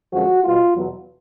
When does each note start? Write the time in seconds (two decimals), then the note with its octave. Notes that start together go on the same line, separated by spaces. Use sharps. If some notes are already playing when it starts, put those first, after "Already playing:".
0.12 F#2 D3 F3 G#3 F#4
0.43 B2 G3 B3 F4
0.75 E2 B2 F#3